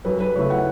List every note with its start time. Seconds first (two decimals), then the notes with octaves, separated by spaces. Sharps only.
0.05 F#2 B4
0.20 B4
0.36 C#3 A3 E4 C#5
0.50 F#5